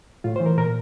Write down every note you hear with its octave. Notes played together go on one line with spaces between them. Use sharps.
A2 F4
C5
E3
A#4
A#2 A#4